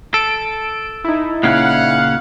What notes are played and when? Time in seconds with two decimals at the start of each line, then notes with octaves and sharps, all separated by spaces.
0.14 A4 D7
1.04 D#4 E4
1.43 A#2 C#3 C#4 F5 F#5